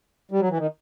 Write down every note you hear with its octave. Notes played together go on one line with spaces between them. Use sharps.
G3
F#3
E3
D#3